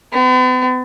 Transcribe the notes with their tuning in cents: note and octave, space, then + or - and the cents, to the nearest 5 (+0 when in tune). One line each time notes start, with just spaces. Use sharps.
B3 +45